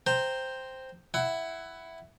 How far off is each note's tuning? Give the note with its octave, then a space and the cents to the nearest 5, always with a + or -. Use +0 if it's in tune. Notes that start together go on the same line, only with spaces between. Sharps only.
C5 +0 G5 +0 A#5 -15
E4 +0 F#5 +20